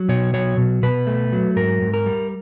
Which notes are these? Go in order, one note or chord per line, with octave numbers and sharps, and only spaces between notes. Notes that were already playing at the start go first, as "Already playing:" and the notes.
Already playing: F#3
B2 C#5
F#3 C#5
B2
B2 B4
A3
F#3
G#2 A#4
G#2
A#4
G3